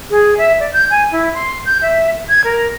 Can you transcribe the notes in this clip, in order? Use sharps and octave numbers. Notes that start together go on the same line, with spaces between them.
G#4
E5
D5
G6
G#5
E4
C6
G6
E5
G#6
A#4